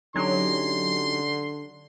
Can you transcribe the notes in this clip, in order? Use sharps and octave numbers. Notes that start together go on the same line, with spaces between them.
D3 F#3 C#4 D#4 G4 C6